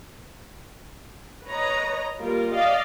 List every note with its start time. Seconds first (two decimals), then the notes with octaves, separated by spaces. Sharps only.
1.49 B4 C#5 D#5 A#5
2.19 G3 A#3 F4 A#4
2.52 D5 D#5 F5